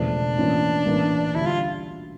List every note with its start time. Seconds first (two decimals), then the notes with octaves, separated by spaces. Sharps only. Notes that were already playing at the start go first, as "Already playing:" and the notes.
Already playing: E1 E2 C#3 F3 A3 D4
0.37 A2 E3 A#3 C#4 F4
0.85 A#1 A2 E3 A#3 C#4
1.34 D2 D3 G3 E4
1.47 F4